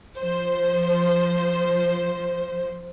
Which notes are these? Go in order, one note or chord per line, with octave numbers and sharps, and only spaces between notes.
F3 C5